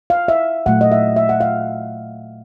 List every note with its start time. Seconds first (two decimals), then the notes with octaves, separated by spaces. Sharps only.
0.10 F5
0.28 E5
0.66 A#2 F#3 A3 F#5
0.81 D#5
0.91 E5
1.16 E5
1.29 F#5
1.41 F5